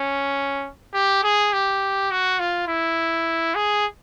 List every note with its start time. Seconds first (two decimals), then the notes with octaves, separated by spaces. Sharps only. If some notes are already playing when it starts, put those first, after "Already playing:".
Already playing: C#4
0.94 G4
1.24 G#4
1.53 G4
2.11 F#4
2.40 F4
2.68 E4
3.55 G#4